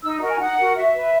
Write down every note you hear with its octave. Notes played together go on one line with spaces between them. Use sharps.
D#4 E6
F#4 A#4 D#5
G#5
D#4 F#5
F#4 A#4
F#4 E5
B4